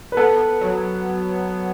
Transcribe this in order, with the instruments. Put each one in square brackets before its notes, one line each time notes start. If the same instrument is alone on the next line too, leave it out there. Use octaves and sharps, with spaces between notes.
[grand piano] B4
[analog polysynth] B3 [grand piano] A4
[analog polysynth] F#3